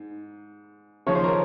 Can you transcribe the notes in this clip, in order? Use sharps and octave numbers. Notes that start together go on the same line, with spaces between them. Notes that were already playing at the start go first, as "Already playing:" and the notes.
Already playing: G#2
D#2 C#3 F3 C#5
C5
A#4